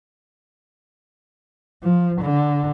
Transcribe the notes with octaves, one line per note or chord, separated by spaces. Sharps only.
F3
D3